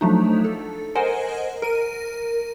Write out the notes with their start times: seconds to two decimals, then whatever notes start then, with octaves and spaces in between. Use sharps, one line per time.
0.01 F3 F#3 A3 D4 D#4
0.45 A4
0.95 A#4 C5 D#5 F#5 G#5
1.62 A#4 D#7